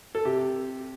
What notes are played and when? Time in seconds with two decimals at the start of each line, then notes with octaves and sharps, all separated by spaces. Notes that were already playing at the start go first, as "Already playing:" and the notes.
0.15 A4
0.25 C3 G4